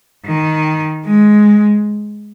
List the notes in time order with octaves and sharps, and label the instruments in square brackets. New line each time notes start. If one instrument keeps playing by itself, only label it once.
[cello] D#3
G#3